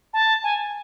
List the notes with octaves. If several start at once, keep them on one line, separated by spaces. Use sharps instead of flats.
A5
G#5